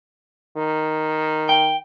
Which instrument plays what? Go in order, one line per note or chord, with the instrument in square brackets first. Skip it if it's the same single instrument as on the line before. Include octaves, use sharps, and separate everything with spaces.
[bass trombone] D#3
[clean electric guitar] G5